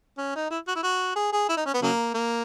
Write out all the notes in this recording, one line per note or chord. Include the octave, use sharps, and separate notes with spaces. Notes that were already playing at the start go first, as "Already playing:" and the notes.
C#4
D#4
E4
F#4
E4
F#4
G#4
G#4
E4
D#4
C#4
B3
C#3 F#3 A#3
A#3